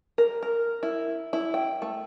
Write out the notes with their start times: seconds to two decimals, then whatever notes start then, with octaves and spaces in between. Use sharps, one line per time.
0.18 A#4
0.43 A#4
0.83 E4
1.33 E4
1.54 G5
1.82 A3